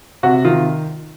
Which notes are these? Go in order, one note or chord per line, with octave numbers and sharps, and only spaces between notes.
C3 F#4
D#3 F4